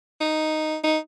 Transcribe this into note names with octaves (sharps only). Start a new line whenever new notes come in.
D#4
D#4